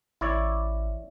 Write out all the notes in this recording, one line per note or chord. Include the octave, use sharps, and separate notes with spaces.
A1 E4 C#5 D5